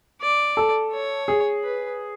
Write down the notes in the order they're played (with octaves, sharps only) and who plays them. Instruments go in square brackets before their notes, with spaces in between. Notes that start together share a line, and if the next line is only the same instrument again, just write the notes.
[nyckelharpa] D5
[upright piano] A4
[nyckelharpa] C#5
[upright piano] G#4
[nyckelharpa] B4